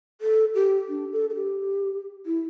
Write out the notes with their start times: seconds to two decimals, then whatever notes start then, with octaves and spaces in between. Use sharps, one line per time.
0.21 A4
0.55 G4
0.89 D4
1.12 A4
1.30 A4
1.35 G4
2.26 E4